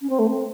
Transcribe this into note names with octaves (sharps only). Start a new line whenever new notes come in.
C#4
C4
A3
C4